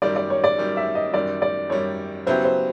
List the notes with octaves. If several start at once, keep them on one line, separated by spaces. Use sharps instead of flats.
F#2 D#3 G3 D5
D5
C#5
D5
F#2 D#3 G3
E5
D#5
F#2 D#3 G3 D5
D5
F#2 D#3 G3 C#5
C#3 F#3 B3 E4 G4 C5
C5